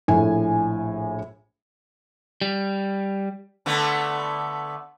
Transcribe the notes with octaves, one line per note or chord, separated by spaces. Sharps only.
A#1 A2 G#5
G3
D3 A3 B3